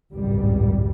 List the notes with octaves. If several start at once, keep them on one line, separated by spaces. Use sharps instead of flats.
G#1 C#2 F#2 A2 G3